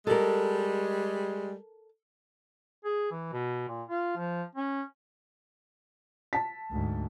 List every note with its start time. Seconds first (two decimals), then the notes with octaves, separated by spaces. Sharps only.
0.07 G3 G#3 A4 A#4
2.85 G#4
3.12 E3
3.33 B2
3.68 A#2
3.89 F4
4.17 F3
4.55 C#4
6.33 A5 B6
6.72 D2 G#2